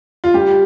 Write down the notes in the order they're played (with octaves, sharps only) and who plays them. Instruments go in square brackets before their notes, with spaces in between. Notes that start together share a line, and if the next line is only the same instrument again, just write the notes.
[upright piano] F4
G3 G4